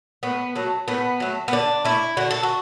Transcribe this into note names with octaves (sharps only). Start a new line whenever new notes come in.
A2 B3
F#3 A3
A2 B3
F#3 A3
B3
D3 D4
A3 E4
D3 F#4
A4
F#4